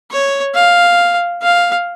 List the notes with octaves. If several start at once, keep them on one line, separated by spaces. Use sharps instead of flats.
C#5
F5
F5